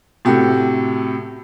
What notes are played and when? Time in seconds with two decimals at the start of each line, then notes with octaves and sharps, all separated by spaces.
0.25 A2 C3 F#4 G4 A4